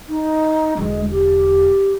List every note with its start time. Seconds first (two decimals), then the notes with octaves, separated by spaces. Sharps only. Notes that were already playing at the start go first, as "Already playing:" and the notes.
0.09 D#4
0.77 E1 D3 G#3
1.11 G4